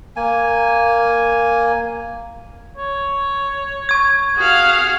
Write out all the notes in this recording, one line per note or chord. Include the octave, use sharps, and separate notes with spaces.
A#3 G#5
C#5
C#6 G#6
F#4 G#4 F5